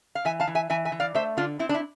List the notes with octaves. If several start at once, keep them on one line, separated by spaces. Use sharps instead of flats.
F5
E3 E5 G#5
F5 A5
E3
E5 G#5
E3 E5 G#5
E5 G#5
E3
D5 F5
A3 C5 E5
D3 D4 F4
C4 E4
D4
E4